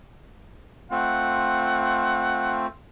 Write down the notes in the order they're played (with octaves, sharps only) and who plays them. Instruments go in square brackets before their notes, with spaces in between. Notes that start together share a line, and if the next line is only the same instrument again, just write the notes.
[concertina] A3 C4 F4 [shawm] F#5